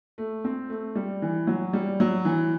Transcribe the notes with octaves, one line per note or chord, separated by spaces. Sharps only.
A3
C4
A3
G3
E3
F#3
G3
F#3
E3